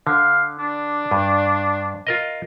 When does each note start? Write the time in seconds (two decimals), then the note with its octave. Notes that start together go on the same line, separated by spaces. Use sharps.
0.07 D3 F5
0.59 D4
1.11 G2
2.07 F4 A#4 D#5